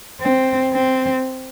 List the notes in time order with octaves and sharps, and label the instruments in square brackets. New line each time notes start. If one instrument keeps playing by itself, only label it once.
[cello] C4
C4